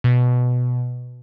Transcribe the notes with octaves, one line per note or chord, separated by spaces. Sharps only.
B2